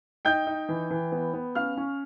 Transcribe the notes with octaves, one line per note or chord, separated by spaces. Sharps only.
D#4 G5 G6
D#4
E3
E3
B3
B3
C#4 F5 F6
C#4